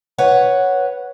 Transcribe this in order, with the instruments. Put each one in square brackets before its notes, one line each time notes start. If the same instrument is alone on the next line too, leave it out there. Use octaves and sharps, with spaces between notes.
[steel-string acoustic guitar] B4 C#5 F#5